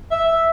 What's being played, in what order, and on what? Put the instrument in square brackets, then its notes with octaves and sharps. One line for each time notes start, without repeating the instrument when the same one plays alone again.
[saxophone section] E5